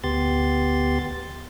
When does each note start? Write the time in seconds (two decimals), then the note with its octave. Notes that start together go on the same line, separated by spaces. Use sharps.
0.04 D2 B3 G4 C6 A6